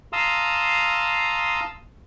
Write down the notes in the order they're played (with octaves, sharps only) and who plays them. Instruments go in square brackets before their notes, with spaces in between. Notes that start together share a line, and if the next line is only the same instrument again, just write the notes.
[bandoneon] F5 A5 A#5 C6 D#6 E6